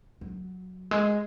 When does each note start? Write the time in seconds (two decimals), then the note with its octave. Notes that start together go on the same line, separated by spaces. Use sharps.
0.21 F#3
0.91 G#3